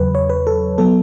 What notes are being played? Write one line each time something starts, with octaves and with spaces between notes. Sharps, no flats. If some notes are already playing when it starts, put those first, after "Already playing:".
Already playing: E2 C#3 F#3 B4
C#5
B4
A4
F#3 B3 A4